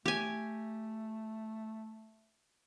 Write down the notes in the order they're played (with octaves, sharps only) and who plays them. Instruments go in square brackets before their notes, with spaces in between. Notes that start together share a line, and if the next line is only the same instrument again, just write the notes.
[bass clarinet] A3 [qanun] G4 G#5